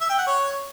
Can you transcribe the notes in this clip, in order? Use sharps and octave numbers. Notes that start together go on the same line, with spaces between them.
E5
G5
F#5
C#5